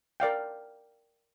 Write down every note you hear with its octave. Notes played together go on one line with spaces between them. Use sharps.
A#4 D5 F5 G5